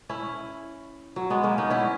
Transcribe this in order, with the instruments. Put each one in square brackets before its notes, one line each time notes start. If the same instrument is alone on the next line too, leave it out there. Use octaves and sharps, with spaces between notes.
[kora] C#4 E4
F#3
G#3 B3
A#3 C#4
B3 D#4
C#4 E4